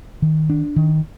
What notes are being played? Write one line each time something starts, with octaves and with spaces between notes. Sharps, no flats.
D#3
D4
D#3